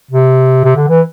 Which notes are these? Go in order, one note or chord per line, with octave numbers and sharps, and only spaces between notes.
C3
C3
D3
E3